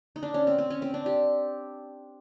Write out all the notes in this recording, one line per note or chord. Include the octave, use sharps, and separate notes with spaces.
D#4
D4
C#4
C4
C4
C#4
C4
D4
G4